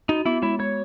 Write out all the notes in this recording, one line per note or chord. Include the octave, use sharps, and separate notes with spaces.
D#4 F#4
B3 E4
G#3 E4
G#3 C#5